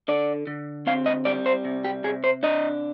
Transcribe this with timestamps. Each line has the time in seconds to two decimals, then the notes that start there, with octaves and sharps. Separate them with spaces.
0.08 D3 D5
0.47 D3
0.87 C4 F5
1.06 D#5
1.25 G3 D5
1.46 C5
1.65 C3
1.84 G4
2.04 C3 G#4
2.24 C5
2.43 D4 D#5